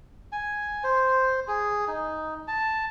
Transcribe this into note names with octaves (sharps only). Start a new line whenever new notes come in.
G#5
C5
G#4
D#4
A5